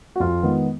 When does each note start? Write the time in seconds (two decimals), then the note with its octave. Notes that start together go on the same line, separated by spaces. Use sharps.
0.16 F#4
0.20 F2 F4
0.43 D#3 G#3 B3